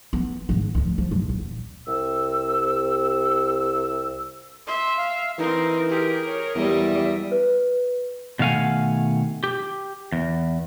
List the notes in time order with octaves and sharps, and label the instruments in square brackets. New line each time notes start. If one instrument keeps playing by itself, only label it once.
[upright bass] B3
G#2 D#3
D2 F3
F3
F#2 G#3
D#1
[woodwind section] C2 C3 E6
[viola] E5 [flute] C6
[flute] F5
[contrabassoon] E3 [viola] C4 A#4 [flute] D#4
[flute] G4 [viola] G#4 A#4
[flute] C#5
[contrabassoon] E2 [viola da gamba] G3 D#5 [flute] E5
[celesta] B4
[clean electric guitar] B2 D#3 A3 F5 F#5 G#5
G4
E2